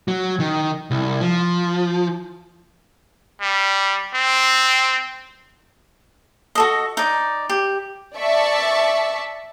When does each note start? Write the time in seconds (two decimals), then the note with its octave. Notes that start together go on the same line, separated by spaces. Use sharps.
0.08 F#3
0.40 D#3
0.91 C2
1.21 F3
3.42 G3
4.15 C4
6.55 F#4 A4 D#5
6.97 D#4 D5
7.50 G4
8.17 D5 E5 A5 C#6